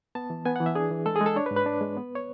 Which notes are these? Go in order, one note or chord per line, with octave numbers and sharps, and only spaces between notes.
B3 A5
E3
B3 G#5
F#5
E3
E5
D4 G#4
E3
G#3 A4
G#4
G#3
A4
D4 C#5
B4
G#2
B4
D4
G#3
B3
C#5